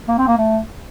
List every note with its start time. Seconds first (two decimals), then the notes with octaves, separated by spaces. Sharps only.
0.08 A#3
0.18 C4
0.28 A#3
0.37 A3